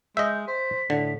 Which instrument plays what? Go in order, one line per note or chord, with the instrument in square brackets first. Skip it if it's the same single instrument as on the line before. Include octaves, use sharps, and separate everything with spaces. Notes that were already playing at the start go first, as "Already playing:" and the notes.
[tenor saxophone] G#3 [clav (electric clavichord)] D#5 E5 [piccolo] G6
[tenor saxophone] C5 [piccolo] B6
[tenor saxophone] A2 [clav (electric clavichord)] D3